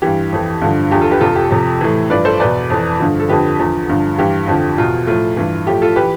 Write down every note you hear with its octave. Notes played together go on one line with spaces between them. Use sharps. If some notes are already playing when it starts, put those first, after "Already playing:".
G2 E3 G4
F2 E3
G2 D3 F3
E2 D3 F3 G4
F4 A4
G4 B4
F2 C3 F3 F4 A4
G4
F2 C3 F3
A2 E3
G2 F3 B4 D5
A4 C5
E2 B2 B4 D5
F2 E3
G2 D3 F3
A4
F2 D3 F3 G4 B4
E2 D3 F3
G2 D3 F3
G2 E3 G4
F2 D3 F3
E2 B2 F4
A2 F3 F4
G2 E3
A2 F3 G4
F4 A4
E3 G4 B4